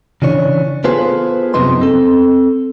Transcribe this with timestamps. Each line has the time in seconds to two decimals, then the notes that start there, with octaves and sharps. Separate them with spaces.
0.22 C#3 E3 D4 C#5
0.84 B3 F4 G#4 A4 B4 C5
1.54 F#2 C3 F3 B3 D#4 C6
1.81 C4 A4